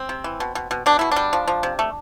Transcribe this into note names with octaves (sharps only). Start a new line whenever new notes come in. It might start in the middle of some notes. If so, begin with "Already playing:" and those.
Already playing: C4
C3
E3
B2
B2
B2
B2 D4
B2 E4
G3 D4
F3
F3
C3
A3